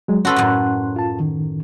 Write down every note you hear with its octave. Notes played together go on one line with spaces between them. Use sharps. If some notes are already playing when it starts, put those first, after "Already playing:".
F#3 G#3
C#4 F#4 A4 B4 C6 F#6
F#2 A2
F4 A5
D#3